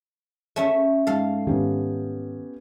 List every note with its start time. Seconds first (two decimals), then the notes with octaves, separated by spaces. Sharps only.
0.56 A3 C#4 E5
1.07 G#2 A4 F5
1.47 G#2 D#3 B3 C#4 G4